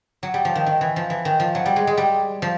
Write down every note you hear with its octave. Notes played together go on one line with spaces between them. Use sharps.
F#3
G3
F3
D#3
D#3
E3
F3
E3
D#3
F3
F#3
G3
G#3
G#3
G3
F3